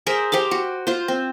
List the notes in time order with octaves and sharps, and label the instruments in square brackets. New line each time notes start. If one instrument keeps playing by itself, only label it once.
[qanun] G#4 A#4 C5 E5
G4 C5 F5 D6
F#4
F4 C5
C4